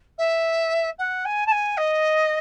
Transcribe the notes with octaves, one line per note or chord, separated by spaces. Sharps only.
E5
F#5
G#5
A5
G#5
D#5